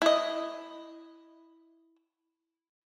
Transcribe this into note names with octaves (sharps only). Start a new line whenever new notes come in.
E4 D#5